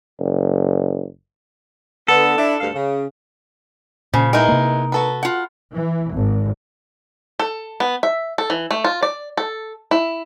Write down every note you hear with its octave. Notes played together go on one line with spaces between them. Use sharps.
F#1
D3 B3 A4
D4 E4
D2 G2 F5
C#3
A#2 C#3 F3
G#3 B3 D#4 E4 A#4
C3 A#3
F#4 A4 B4
F4 F#5
E3
G#1
A4
B3
E5
A4
E3
A3
F4
D5
A4
E4